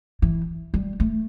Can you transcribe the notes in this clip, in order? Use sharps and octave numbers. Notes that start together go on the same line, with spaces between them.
E3
G3
A3